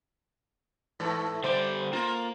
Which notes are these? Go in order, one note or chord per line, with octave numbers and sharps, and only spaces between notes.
G#2 E3 A3
D3 G3 C5 D5
A#3 F4